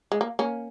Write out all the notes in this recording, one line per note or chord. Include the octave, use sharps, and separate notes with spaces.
G#3
A#3
A#3 C#4